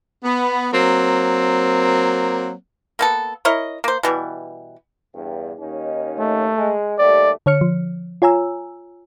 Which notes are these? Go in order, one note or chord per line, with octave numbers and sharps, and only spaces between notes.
B3
F#3 A#3 C4
A#3 B3 A4
E4 A#4 C#5 D#5
A#3 C5
B2 E3 G3
E2 G2
D#2 C#4 D#4
A3
G#3
D#2 G3 A3 D5
D3 C#5 F6 C#7
F3
F4 C#5 G#5 A#5 E6